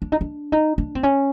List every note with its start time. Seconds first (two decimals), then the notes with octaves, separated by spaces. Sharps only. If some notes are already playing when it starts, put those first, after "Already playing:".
0.02 D4
0.12 D#4
0.21 D4
0.52 D#4
0.78 D4
0.95 C4
1.03 C#4